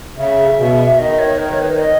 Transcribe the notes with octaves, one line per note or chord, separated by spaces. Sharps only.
C#3 E5
B2
D#3 D#5
C#5
A#4
C#5
B4
D#5